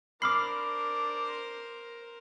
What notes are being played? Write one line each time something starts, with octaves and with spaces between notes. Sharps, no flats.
D4 A#4 C5 B5 D6 F6 C7